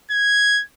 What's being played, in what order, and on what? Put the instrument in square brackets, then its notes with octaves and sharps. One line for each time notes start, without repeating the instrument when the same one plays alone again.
[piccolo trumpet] G#6